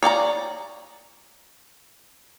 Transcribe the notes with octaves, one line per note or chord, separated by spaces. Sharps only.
C#5 D5 G5 A#5